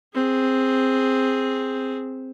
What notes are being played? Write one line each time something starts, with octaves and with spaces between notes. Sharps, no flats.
C4 G#4